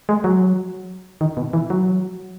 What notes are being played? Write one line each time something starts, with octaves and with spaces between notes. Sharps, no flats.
G#3
F#3
D#3
B2
E3
F#3